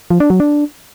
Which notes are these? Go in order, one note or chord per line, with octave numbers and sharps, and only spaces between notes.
F3
D4
F#3
D4